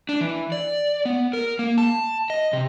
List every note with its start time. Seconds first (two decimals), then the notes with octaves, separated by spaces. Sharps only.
0.09 D4
0.21 E3
0.52 D5
1.05 B3
1.33 A#4
1.59 A#3
1.78 A5
2.30 D#5
2.53 C3